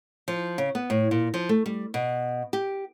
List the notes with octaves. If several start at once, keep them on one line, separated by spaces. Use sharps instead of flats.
F3
C#3
B3
A2
A#2
F3
A3
G3
B2
G4